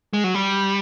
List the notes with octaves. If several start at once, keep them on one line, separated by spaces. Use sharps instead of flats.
G#3
F#3
G3